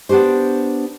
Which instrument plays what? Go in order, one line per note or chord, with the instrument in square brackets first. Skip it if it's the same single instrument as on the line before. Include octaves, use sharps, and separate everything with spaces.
[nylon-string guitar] B3 D4 F#4 G4 C5